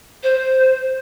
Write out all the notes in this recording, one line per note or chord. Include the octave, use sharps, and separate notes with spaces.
C5